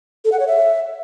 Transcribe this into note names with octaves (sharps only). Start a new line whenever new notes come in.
A4
F#5
C#5
E5